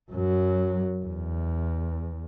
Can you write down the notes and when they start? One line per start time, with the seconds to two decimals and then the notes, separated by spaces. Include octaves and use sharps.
0.12 F#2 F#3
1.06 E2